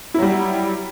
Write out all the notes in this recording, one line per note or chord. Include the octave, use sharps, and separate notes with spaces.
F#3 G3 E4